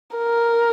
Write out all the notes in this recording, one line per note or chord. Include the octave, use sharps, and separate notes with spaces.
A#4